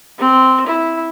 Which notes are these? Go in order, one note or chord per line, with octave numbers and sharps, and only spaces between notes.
C4
E4